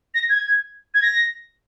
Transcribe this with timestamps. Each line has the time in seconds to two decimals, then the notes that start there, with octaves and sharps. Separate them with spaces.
0.14 A#6
0.29 G#6
0.94 G#6
1.02 A#6